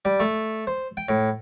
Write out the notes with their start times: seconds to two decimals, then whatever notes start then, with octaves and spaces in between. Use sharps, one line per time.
0.05 G3
0.20 A3
0.67 C5
0.97 G5
1.09 A2